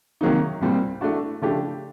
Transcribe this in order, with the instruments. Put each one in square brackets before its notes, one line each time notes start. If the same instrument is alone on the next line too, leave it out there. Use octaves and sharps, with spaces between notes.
[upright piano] C3 D#3 F#3 A#3 D#4
C2 A#2 G3 C4
E3 A3 D4 F#4
C#3 F3 A3 D4 G4